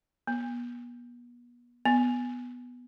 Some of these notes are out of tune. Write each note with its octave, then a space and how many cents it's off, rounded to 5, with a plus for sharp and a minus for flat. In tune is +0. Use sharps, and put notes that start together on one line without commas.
B3 -35
B3 +0